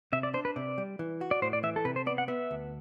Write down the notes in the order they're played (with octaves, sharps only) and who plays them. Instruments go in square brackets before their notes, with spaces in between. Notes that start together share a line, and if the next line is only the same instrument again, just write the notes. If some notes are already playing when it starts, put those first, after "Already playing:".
[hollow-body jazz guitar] C3 [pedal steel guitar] E5
[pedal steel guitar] D5
[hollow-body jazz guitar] D4 [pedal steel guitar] C5
[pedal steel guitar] B4
[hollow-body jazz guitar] C3 [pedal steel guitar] D5
[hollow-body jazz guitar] G3
E3
F#4
[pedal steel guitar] D5
[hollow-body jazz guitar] A2 [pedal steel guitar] C5
[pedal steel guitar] D5
[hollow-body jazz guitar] E3 [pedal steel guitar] E5
[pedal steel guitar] A4
[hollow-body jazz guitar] C3 [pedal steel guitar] B4
[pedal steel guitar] C5
[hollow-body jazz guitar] B3 [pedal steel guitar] D5
[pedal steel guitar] F#5
[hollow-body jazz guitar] B3 [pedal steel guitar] E5
[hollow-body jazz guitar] D2